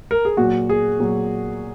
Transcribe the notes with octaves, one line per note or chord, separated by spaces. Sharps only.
A#4
G#4
A#2 F#3 F#4
G#4
A#2 F#3